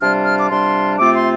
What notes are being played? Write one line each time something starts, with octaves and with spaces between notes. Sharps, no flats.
C3 G3 D4 F4 F6
F6
D6
C3 G3 D4 F4 C6
C3 A3 C4 F4 D6
C6